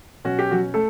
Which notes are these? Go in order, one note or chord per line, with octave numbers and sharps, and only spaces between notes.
B2 F#3 C#4 F#4
G4
F#3 F#4
A3 A4